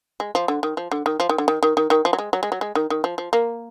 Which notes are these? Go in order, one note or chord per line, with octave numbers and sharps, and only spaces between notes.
G#3
F3
D3
D#3
F3
D3
D#3
F3
D#3
D3
D#3
D#3
D#3
D#3
F3
F#3
G#3
F#3
G#3
F#3
G#3
D#3
D#3
F3
F3
A#3